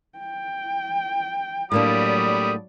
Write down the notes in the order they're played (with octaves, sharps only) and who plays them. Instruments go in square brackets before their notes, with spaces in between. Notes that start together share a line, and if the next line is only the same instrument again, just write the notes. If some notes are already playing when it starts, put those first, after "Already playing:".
[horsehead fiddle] G5
[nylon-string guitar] A2 A#3 D4 [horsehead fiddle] F#3 D5 [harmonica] G3 B5 D#6